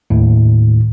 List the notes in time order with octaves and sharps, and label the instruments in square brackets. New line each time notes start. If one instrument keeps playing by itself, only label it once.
[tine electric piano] D#2 A2